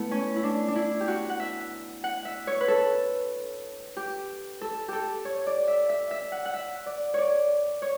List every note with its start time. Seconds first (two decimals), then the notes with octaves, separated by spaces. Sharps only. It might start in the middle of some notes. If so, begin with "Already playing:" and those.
Already playing: A3 B3 E4
0.11 C#4
0.36 E4
0.43 D4
0.68 D4
0.76 E4
1.00 G4
1.08 F#4
1.30 F#5
1.40 E5
2.04 F#5
2.25 E5
2.47 C#5
2.61 B4
2.68 A4
3.97 G4
4.61 A4
4.88 G4 A4
5.25 C#5
5.47 D5
5.68 E5
5.89 E5
6.11 E5
6.32 F#5
6.45 F#5
6.54 E5
6.86 D5
7.14 C#5 D5
7.82 C#5